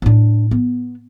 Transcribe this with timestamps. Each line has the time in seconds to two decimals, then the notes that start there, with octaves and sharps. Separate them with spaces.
0.02 A2 D4
0.51 B3